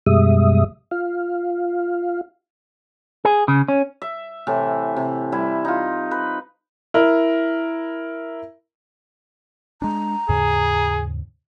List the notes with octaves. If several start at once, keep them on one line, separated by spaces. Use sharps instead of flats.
F#2 B2 G3 G#3 E5 D#6
F4 F5
G#4
C#3
C#4
E5
A2 C3 E3
C3
G3 E4
D#4 F4
B4
E4 A#4
G#3 D4 A#5
D#2 G#2 C#3 G#4